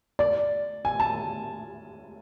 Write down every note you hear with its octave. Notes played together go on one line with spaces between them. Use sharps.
D5
G#5
A5